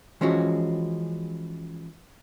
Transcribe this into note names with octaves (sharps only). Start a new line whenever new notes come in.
E3 F3 G#3 C#4 F#4